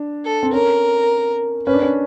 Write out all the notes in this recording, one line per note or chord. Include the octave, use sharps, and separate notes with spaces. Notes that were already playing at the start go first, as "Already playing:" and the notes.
Already playing: D4
A4
C4
C#4 A#4
C#4 B4
D4
C#4